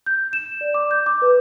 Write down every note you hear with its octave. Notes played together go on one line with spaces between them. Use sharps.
G6
E7
D5
D6
G6
D6
B4